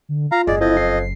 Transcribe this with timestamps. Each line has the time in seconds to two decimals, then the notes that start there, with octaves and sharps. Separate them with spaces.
0.09 D3
0.32 F4 F5 A#5
0.47 F#1 G#3 D5
0.61 F2 E4 D#5
0.77 C7